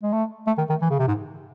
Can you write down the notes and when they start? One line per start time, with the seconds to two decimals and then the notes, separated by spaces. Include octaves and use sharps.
0.03 G#3
0.13 A3
0.47 A3
0.58 D#3
0.69 D#3
0.81 E3
0.90 C#3
0.99 C3
1.08 G#2